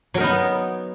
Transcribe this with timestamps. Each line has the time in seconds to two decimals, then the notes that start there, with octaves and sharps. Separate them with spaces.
0.14 F#3
0.17 A#4
0.20 D#4
0.23 B3